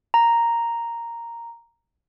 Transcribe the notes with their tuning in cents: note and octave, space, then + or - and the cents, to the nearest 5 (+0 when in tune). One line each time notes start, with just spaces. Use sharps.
A#5 -5